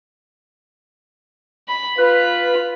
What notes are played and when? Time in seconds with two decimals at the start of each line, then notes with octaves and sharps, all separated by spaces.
1.68 B5
1.98 F4 B4 B5